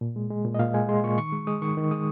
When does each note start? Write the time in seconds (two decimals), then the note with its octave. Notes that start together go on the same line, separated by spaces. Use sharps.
0.01 A#2
0.16 G#3
0.30 G#3
0.45 A#2
0.55 D#5
0.59 A#2 F5
0.74 G#3 G#5
0.89 G#3 C6
1.04 A#2 C#6
1.18 D#3 C#6
1.33 G#3
1.47 G#3 D#6
1.62 D#3 C#6
1.77 D#3
1.91 G#3 D#6